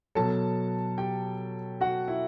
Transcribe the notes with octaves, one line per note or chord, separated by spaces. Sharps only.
B2 F#3 A4 A5
G4 G5
F#4 F#5
E4 E5